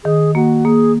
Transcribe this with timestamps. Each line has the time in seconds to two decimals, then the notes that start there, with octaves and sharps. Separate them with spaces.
0.04 D#3 G#4
0.35 A#3 F#4
0.65 A#3 G#4